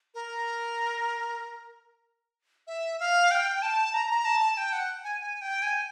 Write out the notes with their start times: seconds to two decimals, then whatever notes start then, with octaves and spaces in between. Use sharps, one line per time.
0.14 A#4
2.67 E5
3.00 F5
3.31 G5
3.62 A5
3.94 A#5
4.10 A#5
4.25 A5
4.41 A5
4.57 G5
4.73 F#5
5.04 G#5
5.21 G#5
5.41 G5
5.62 G#5